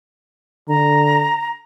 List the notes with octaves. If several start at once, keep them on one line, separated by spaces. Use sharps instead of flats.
D3 A#5